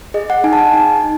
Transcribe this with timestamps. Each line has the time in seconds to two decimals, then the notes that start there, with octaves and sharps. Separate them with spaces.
0.14 G#4 D#5
0.30 F#5
0.44 D#4 G#5
0.53 A5
0.59 G#5
0.73 D#4